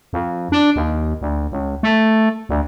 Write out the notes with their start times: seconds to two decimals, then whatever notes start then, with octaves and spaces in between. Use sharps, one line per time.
0.13 F2
0.52 D4
0.76 D#2
1.21 D2
1.52 C#2
1.83 A3
2.49 D2